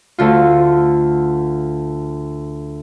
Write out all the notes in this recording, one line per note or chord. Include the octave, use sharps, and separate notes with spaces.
D2 D3 F4